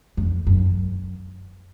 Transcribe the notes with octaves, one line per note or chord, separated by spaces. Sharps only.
F2
F#2